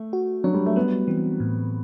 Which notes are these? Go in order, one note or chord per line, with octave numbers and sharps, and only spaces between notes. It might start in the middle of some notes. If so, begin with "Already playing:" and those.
Already playing: A3
F#4
F#3 D4
G3
A3
G3 B3
E3 C4
A2